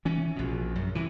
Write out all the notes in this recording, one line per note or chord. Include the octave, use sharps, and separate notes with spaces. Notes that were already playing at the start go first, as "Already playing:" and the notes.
E3 C#4
A#1 B2
F#2
C3 E3